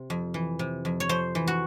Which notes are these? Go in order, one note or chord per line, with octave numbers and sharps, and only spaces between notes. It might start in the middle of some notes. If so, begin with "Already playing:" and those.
Already playing: C3
F2
E3
C3
F2
C#5
F2 C5
E3
F#4